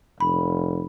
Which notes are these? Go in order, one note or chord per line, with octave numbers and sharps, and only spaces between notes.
F1 B5